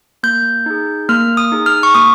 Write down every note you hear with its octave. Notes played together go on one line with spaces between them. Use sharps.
A#3 G6
D#4 G#4
A#3 F6
D#6
D#4 G#4
F6
C#6
A#3 D#6